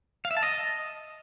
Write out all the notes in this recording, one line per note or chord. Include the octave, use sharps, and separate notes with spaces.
F5
E5
A5
D#5